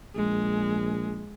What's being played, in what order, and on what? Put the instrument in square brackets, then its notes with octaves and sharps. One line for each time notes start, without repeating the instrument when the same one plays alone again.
[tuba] A#1 [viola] G#3